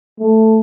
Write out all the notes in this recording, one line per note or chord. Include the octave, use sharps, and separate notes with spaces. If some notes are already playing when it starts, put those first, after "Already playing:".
A3